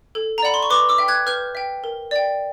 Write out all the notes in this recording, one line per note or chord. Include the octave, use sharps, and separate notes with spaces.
A4
A#5
D5 F#5 B5
C6
C#6
B4 C6 D6
D6 E6
E5 G5
F#6 G#6
B4 F6 G6
E5 G5
A#4
D5 G5